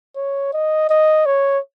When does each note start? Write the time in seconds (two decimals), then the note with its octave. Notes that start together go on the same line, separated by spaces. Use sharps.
0.16 C#5
0.53 D#5
0.89 D#5
1.26 C#5